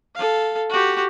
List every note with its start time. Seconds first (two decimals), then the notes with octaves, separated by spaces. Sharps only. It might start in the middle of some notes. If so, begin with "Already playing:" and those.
0.15 A4 F5
0.69 F#4 G4